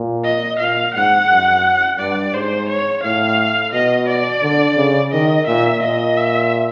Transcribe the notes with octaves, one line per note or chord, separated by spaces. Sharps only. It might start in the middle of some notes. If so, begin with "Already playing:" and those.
Already playing: A#2
D#5
A#2 F5
G#2 F#5
F#2
G2 D5
G#2 C5
C#5
A2 F5
B2 D#5
D5
D3
C#3
D#3 D#5
A#2 E5
A#2 D#5
E5